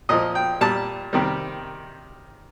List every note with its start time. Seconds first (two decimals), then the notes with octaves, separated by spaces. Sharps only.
0.09 A#2 F3 D#5
0.35 G5
0.61 A#2 G3 A5
1.13 C3 D#3 G3